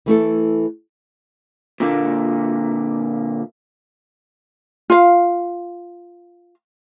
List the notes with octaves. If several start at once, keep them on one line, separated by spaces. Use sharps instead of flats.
E3 A3 E4 A4
A#2 D3 A#3
F4 F5